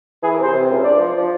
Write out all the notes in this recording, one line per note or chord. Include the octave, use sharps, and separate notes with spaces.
E3 G#4
A#4
C3
C5
C3
C#2
D4 D5
F3
F3